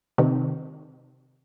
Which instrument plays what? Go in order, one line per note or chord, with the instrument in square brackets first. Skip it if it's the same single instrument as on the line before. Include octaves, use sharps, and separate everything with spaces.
[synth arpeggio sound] C3 D#3